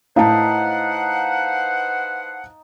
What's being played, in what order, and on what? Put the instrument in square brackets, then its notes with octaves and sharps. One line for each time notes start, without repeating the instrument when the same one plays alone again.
[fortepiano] A2 [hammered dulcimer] D#4 [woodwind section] B4 C5 F#5 [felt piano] F5 A5